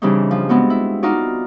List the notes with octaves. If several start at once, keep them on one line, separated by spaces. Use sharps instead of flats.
C#3 E3 G3 C4 D4 D#4
F3
G#3 B3 C4 F#4
E4
D#4 F4 F#4 D5